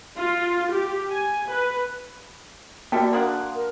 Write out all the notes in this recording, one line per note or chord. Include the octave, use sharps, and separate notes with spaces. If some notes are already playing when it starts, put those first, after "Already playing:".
F4
G4
G#5
B4
A#3 F#4 G4 A4 A#4 D5
A#3 D4 F#5 A5 C6 D#6
A#4